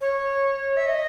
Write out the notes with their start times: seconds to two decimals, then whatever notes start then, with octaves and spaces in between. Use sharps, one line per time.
0.01 C#5
0.77 E5
0.87 D#5